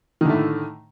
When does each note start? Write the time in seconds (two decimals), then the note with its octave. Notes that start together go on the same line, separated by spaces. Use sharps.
0.21 D#3
0.25 D3
0.29 A3
0.34 A2